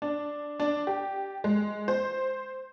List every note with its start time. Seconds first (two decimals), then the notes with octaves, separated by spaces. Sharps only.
0.02 D4
0.60 D4
0.87 G4
1.44 G#3
1.88 C5